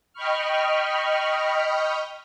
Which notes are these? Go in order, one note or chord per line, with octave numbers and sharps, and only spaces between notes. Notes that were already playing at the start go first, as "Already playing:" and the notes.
D#5 G5 B5 C#6 F6